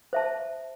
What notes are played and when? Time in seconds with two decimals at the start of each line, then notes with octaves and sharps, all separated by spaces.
0.13 C5 E5 A5